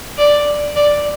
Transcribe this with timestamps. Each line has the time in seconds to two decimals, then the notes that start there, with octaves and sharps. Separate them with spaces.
0.18 D5
0.76 D5